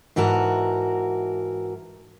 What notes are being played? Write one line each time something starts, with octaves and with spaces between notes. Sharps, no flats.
G#2 E3 F#4 A#4 A5